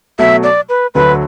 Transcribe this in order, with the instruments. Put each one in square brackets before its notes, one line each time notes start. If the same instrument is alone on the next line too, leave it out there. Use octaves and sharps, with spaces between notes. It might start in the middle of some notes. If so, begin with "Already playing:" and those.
[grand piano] B2 F#3 A3 [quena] E5
[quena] D5
B4
[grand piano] D2 D3 F#3 [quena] B4